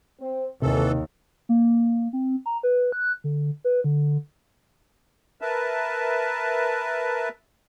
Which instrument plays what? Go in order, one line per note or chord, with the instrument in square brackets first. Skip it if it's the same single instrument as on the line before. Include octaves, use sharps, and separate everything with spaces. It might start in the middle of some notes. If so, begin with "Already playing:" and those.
[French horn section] C4
[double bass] D#2 [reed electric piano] C3 [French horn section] D#3 [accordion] E3 A4
[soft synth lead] A#3
C4
A#5
B4
F#6
D3
B4
D3
[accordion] A#4 B4 E5 A5